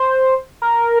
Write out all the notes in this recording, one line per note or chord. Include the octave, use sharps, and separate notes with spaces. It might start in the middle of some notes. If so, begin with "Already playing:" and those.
Already playing: C5
A#4